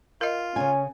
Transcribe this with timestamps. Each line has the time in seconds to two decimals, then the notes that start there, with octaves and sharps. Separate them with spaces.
0.21 F4 A#4 D#5
0.56 C#3 C#4 G#5